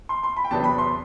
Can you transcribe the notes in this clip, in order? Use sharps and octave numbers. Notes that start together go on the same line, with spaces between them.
C6
C6
B5
G5
E2 C3 F#3 B3 D4 A5
B5
C6